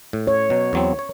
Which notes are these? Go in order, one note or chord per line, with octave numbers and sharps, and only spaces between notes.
A2
C#5
B2 F#3
E2 F#3 C4
C#5